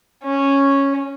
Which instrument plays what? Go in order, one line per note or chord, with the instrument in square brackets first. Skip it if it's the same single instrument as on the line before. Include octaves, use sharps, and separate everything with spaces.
[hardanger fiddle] C#4